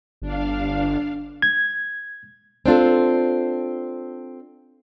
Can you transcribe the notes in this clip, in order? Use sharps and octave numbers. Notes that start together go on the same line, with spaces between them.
G1 D4 F5
G#6
C4 D4 F4 A4